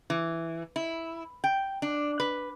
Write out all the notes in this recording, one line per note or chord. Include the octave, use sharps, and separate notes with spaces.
E3
E4
G5
D4
B4